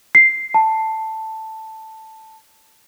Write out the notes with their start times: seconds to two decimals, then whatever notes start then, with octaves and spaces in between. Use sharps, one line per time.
0.15 C7
0.54 A5